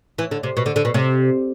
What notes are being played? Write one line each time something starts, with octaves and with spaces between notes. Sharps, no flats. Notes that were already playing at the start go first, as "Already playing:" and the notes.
E3
D3
C3
B2
D3
D3
B2
C3